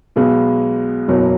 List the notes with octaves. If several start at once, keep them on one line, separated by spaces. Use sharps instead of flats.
B1 B2 G#3 B3
F#1 E2 B2 F#3